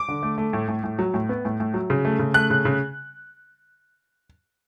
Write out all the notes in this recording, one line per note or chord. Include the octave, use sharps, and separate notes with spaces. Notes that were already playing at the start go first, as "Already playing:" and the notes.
Already playing: D6
D3
A3
A3
A2
A2
A2
F#3
A2
B3
A2
A2
F#3
C#3
A3
C#3
A3 F#6
C#3
C#3